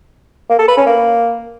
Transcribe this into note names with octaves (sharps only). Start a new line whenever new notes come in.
A#3
A4
B4
C#4
A#3